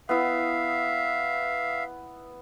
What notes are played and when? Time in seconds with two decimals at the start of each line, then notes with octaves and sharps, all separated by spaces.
0.09 B3 E4 E5 F5 D#6